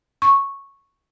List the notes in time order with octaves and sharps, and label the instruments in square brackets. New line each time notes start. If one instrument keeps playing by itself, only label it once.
[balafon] C#6